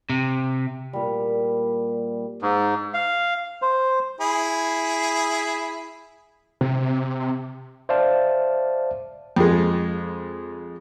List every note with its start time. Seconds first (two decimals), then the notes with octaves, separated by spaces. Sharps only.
0.10 C3
0.93 A#2 G3
2.42 G#2
2.94 F5
3.62 C5
4.21 E4 G#4
6.61 C3
7.89 C5 D5 E5 F5 A5
9.36 F2 G#3